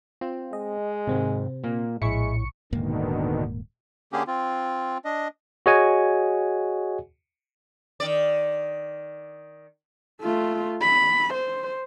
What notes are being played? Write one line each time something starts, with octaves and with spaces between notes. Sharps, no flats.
C4 F4
G#3 D#5
G#1 G#2 C3 C4
A#2 A#3
A#1 A2 G#3 E4 C#6 C#7
D#1 G#2 B2 D3 D#3 A#3
D3 A#3 C#4 G4 G#4
C4 F4
D4 D#5
F#4 G#4 C#5 D#5 F#5 G#5
D#3 D5
A3 F4
B5
C5